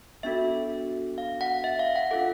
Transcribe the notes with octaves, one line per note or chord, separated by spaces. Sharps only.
B3 D4 F#4 A4 E5
F5
F#5
E5
F5
F#5
D4 F4 A4 F#5